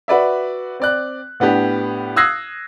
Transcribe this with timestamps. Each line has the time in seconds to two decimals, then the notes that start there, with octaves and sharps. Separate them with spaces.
0.08 F#4 B4 D5 E5
0.80 C4 D5 F#6
1.40 A2 B3 D4 G4
2.16 D#6 E6 F#6 G#6 A#6 C7